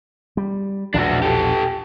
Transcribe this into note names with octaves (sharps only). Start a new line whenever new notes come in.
G3
A#1 E2 B2 D4 F#4
G4 A4